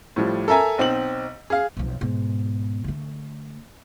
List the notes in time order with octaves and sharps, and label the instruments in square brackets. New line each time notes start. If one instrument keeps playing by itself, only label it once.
[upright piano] A2 F3 G3
A4 A#4 E5 G#5 A#5
B1 C4 D#4 F#7
G#4 F5
[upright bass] B1 F2
G#2 B2
D3 A3